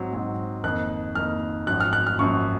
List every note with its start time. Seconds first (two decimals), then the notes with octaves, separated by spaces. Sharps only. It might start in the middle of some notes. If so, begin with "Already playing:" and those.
Already playing: G#2 F#3 C4
0.13 G#2 F#3 C4
0.64 F2 D#3 A#3 D#4 F#6
1.15 F2 D#3 A#3 D#4 F6
1.67 G#1 F#2 F3 F#6
1.80 F6
1.93 F#6
2.07 F6
2.19 G#1 F#2 F3 C#6